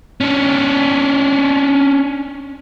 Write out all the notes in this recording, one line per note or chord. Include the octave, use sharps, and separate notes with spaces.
C#4 D4